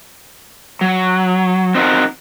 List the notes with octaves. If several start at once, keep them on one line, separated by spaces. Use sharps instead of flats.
F#3
C4 D#4 F#4 A#4